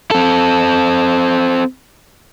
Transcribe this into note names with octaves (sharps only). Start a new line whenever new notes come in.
C4 A4